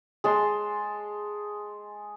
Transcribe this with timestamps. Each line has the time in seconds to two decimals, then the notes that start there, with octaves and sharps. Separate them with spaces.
0.24 G#3 A5 C6